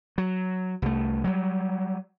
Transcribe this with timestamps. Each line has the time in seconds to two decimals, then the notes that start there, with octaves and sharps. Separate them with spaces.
0.18 F#3
0.82 C2 A3
1.24 F#3 G3